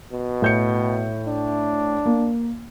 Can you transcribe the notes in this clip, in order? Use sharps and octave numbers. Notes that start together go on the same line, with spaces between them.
B2
A2 G6 C#7
D4
A#3